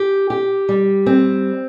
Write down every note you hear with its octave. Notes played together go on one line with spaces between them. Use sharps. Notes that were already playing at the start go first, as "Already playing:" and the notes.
Already playing: G4
G4
G3
C4